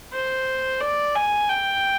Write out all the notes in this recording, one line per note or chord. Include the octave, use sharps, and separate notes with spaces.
C5
D5
G#5
G5